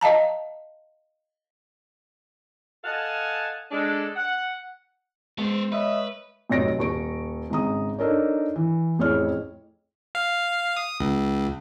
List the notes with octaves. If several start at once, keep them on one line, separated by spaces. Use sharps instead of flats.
D#5 F5 A5 A#5
A4 D#5 F5 F#5 G#5 A5
G#3 D4 A4
F#5
G#3 B3 C5
B4 C#5 D#5 E5
F1 B1 C#5 A#6 D7
D#1 C#6 D7
G#1 C#3 A#5 D#6
D4 D#4 A4 A#4 C#5
E3
A1 F2 E4 G#4 C#5 F6
F5
D#6
C#2